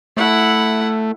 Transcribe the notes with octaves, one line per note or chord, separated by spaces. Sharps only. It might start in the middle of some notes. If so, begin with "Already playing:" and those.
A3 E4 F#5